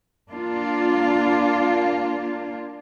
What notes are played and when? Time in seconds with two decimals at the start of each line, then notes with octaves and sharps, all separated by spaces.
0.32 A#3 D4 F4